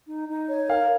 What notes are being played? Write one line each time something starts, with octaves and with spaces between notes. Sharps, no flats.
D#4
D#4
C#5
A#4 F5